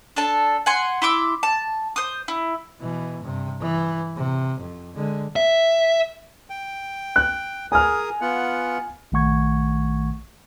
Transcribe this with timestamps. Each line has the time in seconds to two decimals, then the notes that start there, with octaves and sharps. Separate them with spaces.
0.16 D4 A4 A5
0.66 F#5 G#5 C6
1.02 E4 C6 D6 E6
1.43 A5
1.96 C5 D#6
2.28 E4
2.79 B2 E3
3.22 G2 C3
3.60 E3
4.16 C3
4.60 F2
4.96 D3 G#3
5.36 E5
6.50 G5
7.16 F#6
7.72 G#4 A#4 G#5 D#6 F6
8.21 B3 F4 F#5
9.12 A#1 D#3 A3 F#5 C#6 G#6